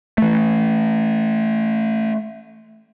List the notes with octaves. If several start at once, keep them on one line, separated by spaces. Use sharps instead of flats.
E3 A3